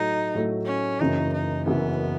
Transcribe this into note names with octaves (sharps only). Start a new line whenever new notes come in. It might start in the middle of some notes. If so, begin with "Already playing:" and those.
Already playing: A2 F#3 A3 D#4
A2 F#3 A3
C#4
F#1 F#2 E3 D#4
D#4
F#1 F#2 E3 B3